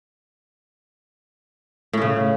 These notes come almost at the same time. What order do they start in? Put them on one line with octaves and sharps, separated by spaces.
A2 C#4 C#3